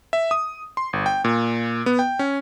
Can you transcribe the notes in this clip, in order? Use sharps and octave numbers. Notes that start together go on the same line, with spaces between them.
E5
D#6
C6
G1
G5
A#2
B3
G5
C#4